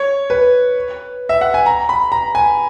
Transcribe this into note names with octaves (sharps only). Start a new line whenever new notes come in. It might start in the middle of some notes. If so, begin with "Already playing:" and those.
Already playing: C#5
B4
E5
F#5
G#5
A#5
B5
A#5
G#5